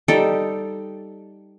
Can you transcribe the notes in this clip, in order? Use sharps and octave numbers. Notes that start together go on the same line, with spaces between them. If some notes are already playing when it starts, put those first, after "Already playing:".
G3 D#4 A4 D6